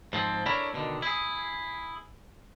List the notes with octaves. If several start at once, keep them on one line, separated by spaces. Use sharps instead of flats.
G#2 F3 C4
D4 E4 A4 A#4 C#5 B5
B2 D3 D#3
E4 G#4